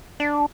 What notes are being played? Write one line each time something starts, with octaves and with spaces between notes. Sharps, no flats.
D4